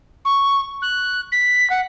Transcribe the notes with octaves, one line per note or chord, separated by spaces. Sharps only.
C#6
F#6
B6
F#5